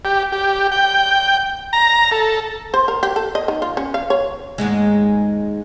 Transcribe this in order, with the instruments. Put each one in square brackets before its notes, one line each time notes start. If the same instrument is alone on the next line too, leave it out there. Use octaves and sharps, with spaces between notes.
[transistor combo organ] G4
G4
G5
A#5
A4
[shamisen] C5
A#4
G4
A4
D#5
D#3
F4
C#4
F5
C#5
[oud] D#2 G#2 G#3